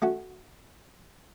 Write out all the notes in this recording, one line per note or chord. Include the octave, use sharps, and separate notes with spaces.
A3 C#4 F#4